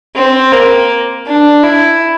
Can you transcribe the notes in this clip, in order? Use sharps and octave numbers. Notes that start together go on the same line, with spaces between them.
C4
A#3
D4
E4